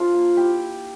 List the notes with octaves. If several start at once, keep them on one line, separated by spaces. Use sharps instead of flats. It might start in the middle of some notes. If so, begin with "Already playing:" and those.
Already playing: F3 D4 F4
A#3
E4 G4